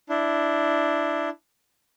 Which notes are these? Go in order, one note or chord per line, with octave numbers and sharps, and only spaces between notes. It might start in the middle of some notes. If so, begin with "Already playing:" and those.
D4 E4